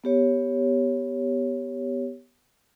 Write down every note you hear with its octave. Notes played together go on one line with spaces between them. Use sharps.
B3 G4 C#5